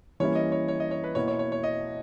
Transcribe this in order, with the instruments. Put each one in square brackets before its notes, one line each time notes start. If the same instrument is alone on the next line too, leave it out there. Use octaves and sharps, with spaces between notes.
[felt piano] E3 G3 A#3 C#4 E4 [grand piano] C#5
[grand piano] D#5
C#5
C#5
D#5
C#5
B4
[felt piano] B2 A#3 E4 [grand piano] C#5
[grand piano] C#5
C#5
C#5
D#5